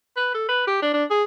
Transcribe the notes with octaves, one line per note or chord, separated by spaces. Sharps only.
B4
A4
B4
G4
D4
D4
G#4